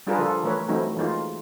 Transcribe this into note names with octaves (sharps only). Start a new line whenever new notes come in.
G3 D4 F4 G#4 A#4 B4
D3 F3 F4 A4
E3 A3 A#4 B4 C#5
E3 F#3 A3 C4 D#4 E4
E3 G#3 A#3 D#4 F4